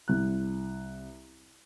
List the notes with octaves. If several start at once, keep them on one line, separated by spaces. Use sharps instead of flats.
C2 F#6